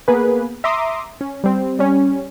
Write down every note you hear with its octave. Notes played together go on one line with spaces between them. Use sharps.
A#3 B3 G#4 B4
E5 A#5 C6 D6 D#6
C#4
G3 C4
G3 C#4